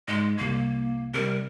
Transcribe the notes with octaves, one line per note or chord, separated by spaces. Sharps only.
G#2 G#3 C6
C2 A#3 G#6
C3 G3 A#4